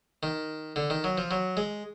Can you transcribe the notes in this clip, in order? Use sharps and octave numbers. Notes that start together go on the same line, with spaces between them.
D#3
D3
D#3
F#3
F3
F#3
G#3